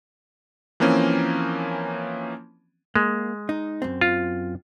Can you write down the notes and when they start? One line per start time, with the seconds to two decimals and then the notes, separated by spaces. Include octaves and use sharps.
0.80 E3 F3 A#3 C4 C#4
2.96 G#3 A#3
3.49 D#4
3.82 F#2 C4
4.01 F4